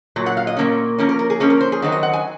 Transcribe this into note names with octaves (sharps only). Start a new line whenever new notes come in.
A#2 F#3
F#5
F5
D#5
A#2 F#3 A#3 C#4
F3 A#3 C#4 A#4
A#4
A#4
G#4
F3 A#3 C#4 G#4
A#4
C5
G#4
D#3 F#3 C4 D#4 F#4
D#5
F#5
G#5